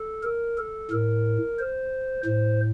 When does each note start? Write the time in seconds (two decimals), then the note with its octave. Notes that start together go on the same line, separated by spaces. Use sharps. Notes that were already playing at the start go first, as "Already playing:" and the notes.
Already playing: A4
0.23 A#4
0.58 A4
0.91 A2 A#4
1.59 C5
2.25 A2 C5